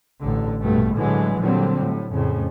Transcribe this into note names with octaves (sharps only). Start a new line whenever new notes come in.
A1 D3
A#1 G2 B2 A3
A2 D3 E3 F#3 G#3
A#2 D3 F#3 G3 C4
A2
F2 A2 C#3